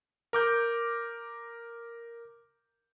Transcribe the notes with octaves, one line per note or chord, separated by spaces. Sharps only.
A#4 D6 G6